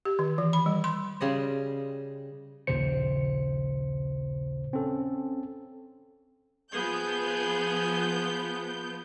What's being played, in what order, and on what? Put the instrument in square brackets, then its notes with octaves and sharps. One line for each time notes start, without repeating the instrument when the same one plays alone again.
[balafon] G4
D#3
E3
B5
G3
C6
[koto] C#3 G3 D#5
[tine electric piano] A#1 D#2 A#2 C#3 C5 C#7
C4 C#4 A4
[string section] F3 B3 G6 [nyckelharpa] G#4